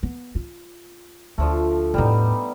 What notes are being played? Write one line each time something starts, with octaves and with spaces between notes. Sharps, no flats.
B3
F4
D2 D3 F3 A3
E2 A2 G3 B3 D#4